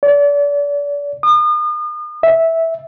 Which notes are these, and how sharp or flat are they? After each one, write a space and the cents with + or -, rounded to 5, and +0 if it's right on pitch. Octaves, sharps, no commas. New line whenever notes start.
D5 -35
D#6 -40
E5 -10